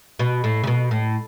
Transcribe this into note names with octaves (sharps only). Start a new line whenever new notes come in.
B2
A2
C#3
B2
A2